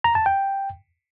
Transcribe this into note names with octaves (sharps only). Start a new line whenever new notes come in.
A#5
A5
G5